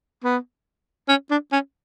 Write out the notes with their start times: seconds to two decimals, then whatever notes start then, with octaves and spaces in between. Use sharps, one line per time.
0.24 B3
1.08 C#4
1.30 D4
1.52 C#4